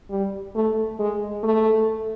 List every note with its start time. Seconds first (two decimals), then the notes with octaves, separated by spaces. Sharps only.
0.10 G3
0.55 A3
0.99 G#3
1.43 A3